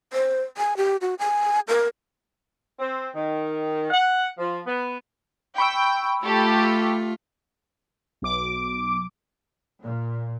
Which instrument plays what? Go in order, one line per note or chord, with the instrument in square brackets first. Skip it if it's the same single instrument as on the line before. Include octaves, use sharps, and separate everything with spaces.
[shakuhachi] C5
G#5
G4
F#4
G#5
A#4
[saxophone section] C4
D#3
F#5
F3
B3
[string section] G5 [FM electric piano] B5 C#6 E6
[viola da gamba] A3 F4 [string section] G4 A4
[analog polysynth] B1 D6
[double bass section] A#2